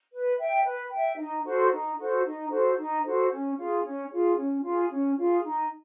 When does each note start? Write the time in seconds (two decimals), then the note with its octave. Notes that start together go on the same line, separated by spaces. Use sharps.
0.12 B4
0.39 E5 G5
0.64 B4
0.91 E5 G5
1.17 D#4
1.44 F#4 A4 C5
1.71 D#4
1.98 F#4 A4 C5
2.24 D#4
2.50 F#4 A4 C5
2.77 D#4
3.04 F#4 A4 C5
3.31 C#4
3.57 F4 G#4
3.83 C#4
4.10 F4 G#4
4.37 C#4
4.63 F4 G#4
4.90 C#4
5.17 F4 G#4
5.43 D#4